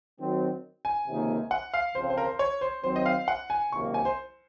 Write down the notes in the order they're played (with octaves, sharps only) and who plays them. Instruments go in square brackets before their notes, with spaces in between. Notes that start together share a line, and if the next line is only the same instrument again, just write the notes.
[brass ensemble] D#3 F#3 C4 F#4
[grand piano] G#5
[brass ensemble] C#2 C3 D#3 A#3
[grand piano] F#5
F5
[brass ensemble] F2 C#3 F3 C4 [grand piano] C5
[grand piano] C5
A#4
C5
C#5
C5
[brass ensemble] D#3 F#3 C4 [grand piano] C5
[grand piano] D#5
F5
F#5
G#5
[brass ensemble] C#2 C3 D#3 F#3 A#3 [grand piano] C#6
[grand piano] G#5
C5